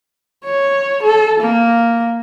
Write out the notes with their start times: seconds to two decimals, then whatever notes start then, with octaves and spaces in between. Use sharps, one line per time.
0.45 C#5
1.03 A4
1.40 A#3